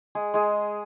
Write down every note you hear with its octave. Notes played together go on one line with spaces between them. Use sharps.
G#3 G#4
G#3 G#4